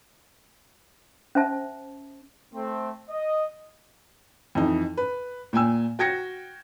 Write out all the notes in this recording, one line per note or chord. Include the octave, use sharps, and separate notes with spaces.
C#4 C5 E5 A5
A3 C4
D#5
F2 E3 D#4
B4
A#2 G5 G#5 E6
F#4 G5 G#6 A#6 C#7